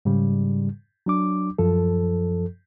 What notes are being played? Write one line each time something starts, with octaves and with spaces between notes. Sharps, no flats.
G#2 C#3 G3
F#3 D4 D6
F#2 F3 A4